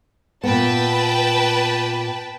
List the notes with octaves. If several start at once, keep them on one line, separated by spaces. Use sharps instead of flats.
A#2 B3 B4 G5 A5